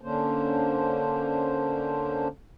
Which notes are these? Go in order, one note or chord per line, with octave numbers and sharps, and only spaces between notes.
D3 A#3 C#4 D4 C5